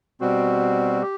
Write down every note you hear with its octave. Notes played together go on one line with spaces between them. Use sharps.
B2 G3 C4 F#4
G4